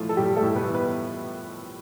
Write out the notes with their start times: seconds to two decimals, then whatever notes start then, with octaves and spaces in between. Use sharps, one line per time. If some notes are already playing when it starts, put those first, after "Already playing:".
Already playing: A2 E3 F3 A3 F4
0.09 A4
0.17 A2 G3 G4
0.36 A3 A4
0.43 A2
0.55 B3 B4
0.68 E3
0.74 B3 B4